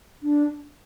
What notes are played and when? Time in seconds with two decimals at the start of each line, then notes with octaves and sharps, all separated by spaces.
0.23 D4